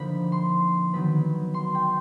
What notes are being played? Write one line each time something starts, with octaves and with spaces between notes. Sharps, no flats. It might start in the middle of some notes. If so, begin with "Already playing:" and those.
Already playing: D3 F3 A#3 D#4 B5
C6
D#3 F#3 B3 B5
C6
G5